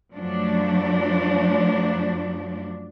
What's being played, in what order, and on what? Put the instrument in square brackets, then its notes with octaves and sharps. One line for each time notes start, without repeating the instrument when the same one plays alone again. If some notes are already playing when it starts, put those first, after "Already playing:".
[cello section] F#2 F3 F#3 A3 D4